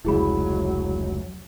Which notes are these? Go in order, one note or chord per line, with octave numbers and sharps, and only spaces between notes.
F1 C#2 F#3 E4 G#4 B5